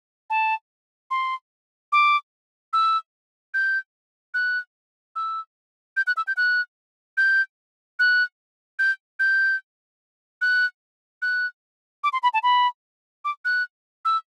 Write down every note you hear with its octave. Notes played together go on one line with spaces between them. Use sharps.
A5
C6
D6
E6
G6
F#6
E6
G6
F#6
E6
G6
F#6
G6
F#6
G6
G6
F#6
F#6
D6
C6
B5
A5
B5
D6
F#6
E6